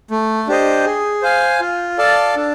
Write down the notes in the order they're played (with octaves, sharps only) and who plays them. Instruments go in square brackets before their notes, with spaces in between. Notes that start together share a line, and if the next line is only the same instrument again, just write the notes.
[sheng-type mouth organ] A3
D4 G4 C5 D#5
G#4
C5 F5 G#5
F4
A4 D5 F5 A5
D4